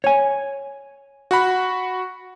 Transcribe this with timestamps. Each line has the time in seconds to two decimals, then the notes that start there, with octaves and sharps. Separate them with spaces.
0.04 C#5 G#5
1.31 F#4 F#5 B5